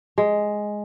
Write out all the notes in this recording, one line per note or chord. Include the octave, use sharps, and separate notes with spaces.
G#3